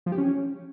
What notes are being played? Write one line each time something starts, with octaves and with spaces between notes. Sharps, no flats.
F3
G4
C#4